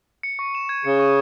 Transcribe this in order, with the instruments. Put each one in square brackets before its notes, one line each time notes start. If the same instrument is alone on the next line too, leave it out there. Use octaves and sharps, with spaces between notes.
[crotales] C#7
C#6
E7
G#6
[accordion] C#3 [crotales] C#7
[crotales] C#6